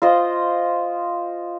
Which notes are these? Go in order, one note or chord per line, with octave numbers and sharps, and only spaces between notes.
F4 C5 D#5